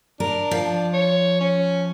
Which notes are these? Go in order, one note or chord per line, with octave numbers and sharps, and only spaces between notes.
D4 A#4
F3
C#5
C#4